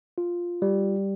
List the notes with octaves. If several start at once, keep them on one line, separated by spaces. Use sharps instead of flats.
F4
G3